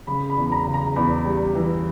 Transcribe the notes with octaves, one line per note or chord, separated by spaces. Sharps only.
C#3 B5
B5
E2
B5
A#5
C#3
A#5
E2 B5
G3
E3